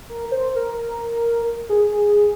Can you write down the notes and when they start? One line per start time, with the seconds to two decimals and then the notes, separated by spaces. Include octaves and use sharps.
0.09 A#4
0.31 C5
0.55 A#4
0.78 A#4
1.69 G#4